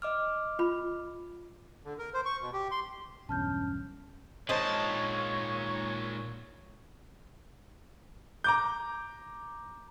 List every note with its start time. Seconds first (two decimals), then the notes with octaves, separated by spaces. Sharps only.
0.02 D#5 D6 F6
0.59 F4 B5
1.85 D3
1.99 A#4
2.14 C5
2.25 C#6
2.41 B2
2.53 G4
2.71 C6
3.29 B1 E2 G2 C#4 A5 F6 G6
4.49 A#2 D#3 G#3 C5 C#5 D#5 A5
8.44 A#5 D6 G6